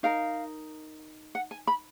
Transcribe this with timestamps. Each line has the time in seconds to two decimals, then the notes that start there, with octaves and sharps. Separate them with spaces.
0.03 D#4 A#4 F5
1.35 F#5
1.51 G#5
1.67 B5